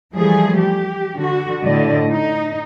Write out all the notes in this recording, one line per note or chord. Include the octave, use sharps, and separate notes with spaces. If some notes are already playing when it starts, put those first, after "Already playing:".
E3 F3 G3 A3 G#4
G4
D3 F#4
A2 D3 D5 D#5
D#4